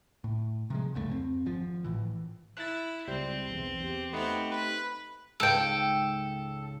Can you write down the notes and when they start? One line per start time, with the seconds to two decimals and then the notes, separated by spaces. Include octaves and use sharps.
0.24 A2
0.70 C3 F3 G#3
0.94 F#1 C#2 G2 A3
1.10 F2 A#3 C4
1.46 G#1 F3
1.84 G#1 A2 E3
2.57 E4 F#6 A6
3.08 C#2 G3 C4 G6
3.48 B1 E2
3.83 E2 G4
4.13 A3 B3 C4 D#4
4.51 B4
5.40 C#2 G#2 A4 G5